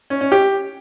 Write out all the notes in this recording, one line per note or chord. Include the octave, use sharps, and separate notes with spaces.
C#4
C#4
G4